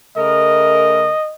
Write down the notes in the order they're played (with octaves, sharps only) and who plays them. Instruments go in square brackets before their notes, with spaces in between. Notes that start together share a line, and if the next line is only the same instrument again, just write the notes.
[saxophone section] C#3 A3 A#4 [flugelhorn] D#5